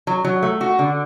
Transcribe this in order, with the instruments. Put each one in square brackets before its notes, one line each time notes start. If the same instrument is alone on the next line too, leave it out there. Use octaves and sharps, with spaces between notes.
[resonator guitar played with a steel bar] F#3
F#3
A3
F#4
D3